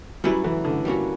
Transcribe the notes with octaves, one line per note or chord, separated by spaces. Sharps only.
F#3 G3 C#4 E4 B4
E3
D3
G3 A#3 C#4 F#4